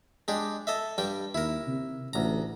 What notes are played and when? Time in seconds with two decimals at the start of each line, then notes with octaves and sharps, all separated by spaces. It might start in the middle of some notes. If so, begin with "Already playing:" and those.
0.28 G#3 D4 G4
0.67 A4 D#5 E5
0.98 G2 G3 G5
1.35 D#2 E4 A#4
1.67 C3
2.13 A1 D2 A#5